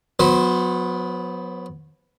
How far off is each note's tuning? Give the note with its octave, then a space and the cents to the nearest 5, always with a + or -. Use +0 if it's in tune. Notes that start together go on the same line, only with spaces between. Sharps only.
F#3 -35 B3 +0 C5 +0